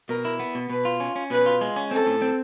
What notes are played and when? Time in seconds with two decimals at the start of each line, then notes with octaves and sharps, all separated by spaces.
0.09 B2 A#4
0.25 E4
0.40 B3
0.55 B2
0.70 B2 B4
0.85 F4
1.00 C#4
1.16 C#4
1.30 B2 B4
1.46 F4
1.61 G#3
1.76 C#4
1.91 C4 A4
2.07 A2
2.22 C4